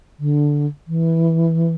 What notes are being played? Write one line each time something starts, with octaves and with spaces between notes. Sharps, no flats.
D3
E3